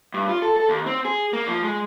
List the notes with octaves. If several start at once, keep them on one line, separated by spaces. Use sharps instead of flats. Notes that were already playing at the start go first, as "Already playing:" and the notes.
G2
F4
A4
A4
D#2
C4
G#4
A#3
F3
G#3